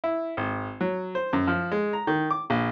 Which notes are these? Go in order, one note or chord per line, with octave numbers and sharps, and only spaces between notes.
E4
G#1
F#3
C5
F#2
F3
G#3
A#5
D#3
D6
A#1